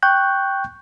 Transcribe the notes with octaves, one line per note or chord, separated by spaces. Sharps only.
G5 C#6 F#6 G6